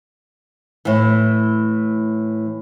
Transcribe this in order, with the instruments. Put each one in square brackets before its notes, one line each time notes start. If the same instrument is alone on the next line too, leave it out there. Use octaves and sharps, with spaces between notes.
[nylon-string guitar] A2 E3